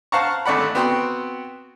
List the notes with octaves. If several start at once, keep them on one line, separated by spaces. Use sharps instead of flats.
C5 F5 F#5 A5 A#5 C#6
G#1 A3 D5 F#5 B5
B3 C4 F#4 G5 C6